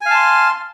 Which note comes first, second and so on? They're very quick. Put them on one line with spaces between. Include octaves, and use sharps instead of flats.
G#5 F5 A5 C6